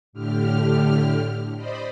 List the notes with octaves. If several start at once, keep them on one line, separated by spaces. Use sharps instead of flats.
A2 D3 G4 F6
C5 D5 D#5 B5